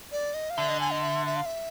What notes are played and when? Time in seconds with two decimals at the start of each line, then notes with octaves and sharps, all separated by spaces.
0.12 D5
0.34 D#5
0.50 F5
0.57 D3 E5
0.69 D#5
0.80 G#5
0.91 D#5
1.02 E5
1.26 E5
1.36 F5
1.46 E5